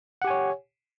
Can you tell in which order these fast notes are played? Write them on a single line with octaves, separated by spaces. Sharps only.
F#5 G4 G#5 C#5